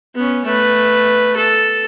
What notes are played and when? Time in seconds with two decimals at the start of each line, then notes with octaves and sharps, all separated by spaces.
0.15 B3 C#4
0.45 A3 B4
1.36 A4